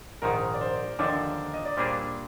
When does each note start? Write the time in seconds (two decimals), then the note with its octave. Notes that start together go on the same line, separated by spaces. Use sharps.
0.22 A#1 G#2 D#3 A#4
0.54 D5
0.61 C5
0.99 D#2 D3 F3 D4 D5
1.54 D#5
1.65 D5
1.77 A#2 G3 A#3 D4 G#4 C5